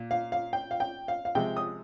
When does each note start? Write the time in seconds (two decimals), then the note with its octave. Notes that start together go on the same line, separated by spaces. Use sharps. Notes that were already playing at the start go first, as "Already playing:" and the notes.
Already playing: A#2
0.11 F5
0.32 F5
0.53 G5
0.71 F5
0.80 G5
1.08 F5
1.25 F5
1.35 C3 F3 G#3 G5
1.57 D#6